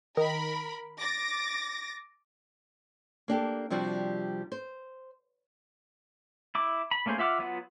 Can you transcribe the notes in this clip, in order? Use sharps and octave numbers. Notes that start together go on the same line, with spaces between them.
D#3 A#4 B5
D6 A6 A#6
A#3 D4 G4 A4
C3 F3 G3 D4 F#4
C5
E4 D6
B5
A3 A#3 C#4 G#4 C5
F4 E5 F#5 D6 F6
F#3 B3 F4 F#5